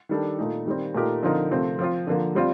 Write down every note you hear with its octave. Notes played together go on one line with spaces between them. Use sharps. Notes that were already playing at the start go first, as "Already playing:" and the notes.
D#3 G3 D4 A4
A#2 A3 D#4
D#3 G3 C4
A#2 A3 D#4 G4 A#4
D3 F3 C4 D#4 A#4
C3 F3 A3 C4
F3 C4 F4
D3 F3 A#3
G3 C4 F4